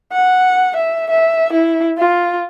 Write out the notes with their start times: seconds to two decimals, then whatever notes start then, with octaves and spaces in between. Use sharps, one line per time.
0.13 F#5
0.76 E5
1.10 E5
1.53 E4
1.98 F4